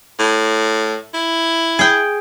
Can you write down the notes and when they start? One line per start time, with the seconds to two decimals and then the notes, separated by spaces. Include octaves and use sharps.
0.19 A2
1.14 E4
1.79 G#4 G5